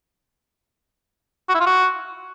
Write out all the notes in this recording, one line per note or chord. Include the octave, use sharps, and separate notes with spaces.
F#4
E4
F4
F#4